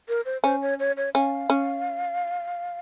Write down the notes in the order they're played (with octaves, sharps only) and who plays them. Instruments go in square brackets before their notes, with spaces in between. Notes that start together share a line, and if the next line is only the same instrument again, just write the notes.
[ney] A#4
C5
[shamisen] C#4 [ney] C5
[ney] C#5
C#5
C#5
[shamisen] C#4 [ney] F5
[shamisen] C#4